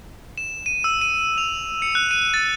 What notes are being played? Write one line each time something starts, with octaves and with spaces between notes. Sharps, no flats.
E7
D#7
E6
D#7
F7
C#7
F#6
D#7
A6